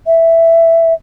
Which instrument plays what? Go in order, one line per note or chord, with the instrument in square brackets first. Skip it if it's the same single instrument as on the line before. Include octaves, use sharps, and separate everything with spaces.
[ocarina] E5